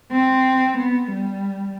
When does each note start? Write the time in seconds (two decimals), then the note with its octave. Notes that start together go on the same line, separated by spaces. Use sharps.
0.12 C4
0.78 B3
1.12 G3